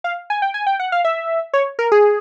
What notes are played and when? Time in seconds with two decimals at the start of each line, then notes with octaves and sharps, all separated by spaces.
0.04 F5
0.30 G#5
0.42 G5
0.54 G#5
0.67 G5
0.80 F#5
0.92 F5
1.05 E5
1.53 C#5
1.79 A#4
1.92 G#4